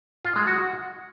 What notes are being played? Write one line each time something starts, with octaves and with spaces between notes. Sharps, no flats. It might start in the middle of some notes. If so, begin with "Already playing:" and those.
F4
G#3
F#4
F#4